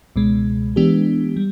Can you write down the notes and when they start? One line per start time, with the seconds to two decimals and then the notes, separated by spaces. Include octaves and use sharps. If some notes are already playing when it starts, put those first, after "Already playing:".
0.16 C#2 B2 G#3
0.76 E3 G#3 B3 D4 G4
1.37 G3